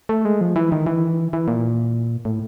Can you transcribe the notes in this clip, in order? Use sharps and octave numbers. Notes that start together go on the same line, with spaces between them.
A3
G#3
F3
E3
D#3
E3
E3
A#2
A2